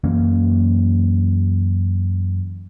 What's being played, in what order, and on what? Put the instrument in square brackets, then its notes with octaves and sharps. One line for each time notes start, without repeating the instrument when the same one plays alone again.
[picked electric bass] F#2 E3 A#3 C#4